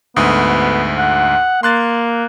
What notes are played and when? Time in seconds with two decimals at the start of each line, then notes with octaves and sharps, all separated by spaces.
0.16 D2 G#2 B3 D#6
0.99 F#5
1.63 A#3 C6 F#6 A6